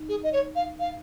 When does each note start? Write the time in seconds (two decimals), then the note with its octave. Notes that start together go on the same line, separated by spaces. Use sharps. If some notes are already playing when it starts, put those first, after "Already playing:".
Already playing: D#4
0.09 G#4
0.23 D#5
0.33 C#5
0.56 F5
0.79 F5